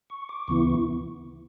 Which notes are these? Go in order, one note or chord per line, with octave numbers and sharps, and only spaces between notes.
C#6
D6
D2 C#3 E3 B3 E4 C#6